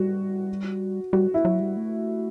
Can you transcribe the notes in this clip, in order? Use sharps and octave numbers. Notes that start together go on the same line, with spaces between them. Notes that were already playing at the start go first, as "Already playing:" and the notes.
Already playing: G3 F#4
G3 F#4
E4
F#3
G3
A3